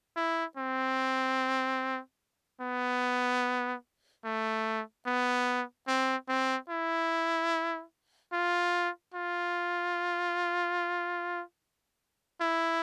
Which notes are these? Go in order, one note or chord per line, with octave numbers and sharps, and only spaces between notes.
E4
C4
B3
A3
B3
C4
C4
E4
F4
F4
E4